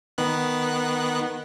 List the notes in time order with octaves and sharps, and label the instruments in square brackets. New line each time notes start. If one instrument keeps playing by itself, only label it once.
[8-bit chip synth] D#3 B3 F#6